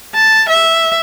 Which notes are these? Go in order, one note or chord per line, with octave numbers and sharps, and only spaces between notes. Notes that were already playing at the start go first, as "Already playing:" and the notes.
A5
E5